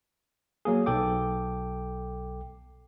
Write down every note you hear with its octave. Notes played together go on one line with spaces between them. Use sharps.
F#3 A#3 G#4
B1 A4 G5 D6